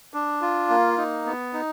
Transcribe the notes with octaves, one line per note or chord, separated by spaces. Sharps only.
D4
F4
A#3
D#4
B3
D#4